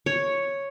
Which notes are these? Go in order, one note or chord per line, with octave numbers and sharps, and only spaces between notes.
C#5